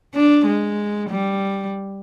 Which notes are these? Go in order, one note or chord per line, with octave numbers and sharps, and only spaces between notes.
D4
G#3
G3